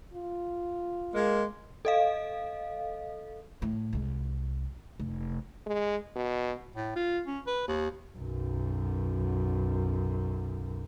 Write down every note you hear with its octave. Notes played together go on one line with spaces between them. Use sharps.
F4
G#3 A#3
A4 D#5 F5
A2
C2 G#3
F1
G#3
B2
A2
F4
C#4
B4
D#2
B1 F#2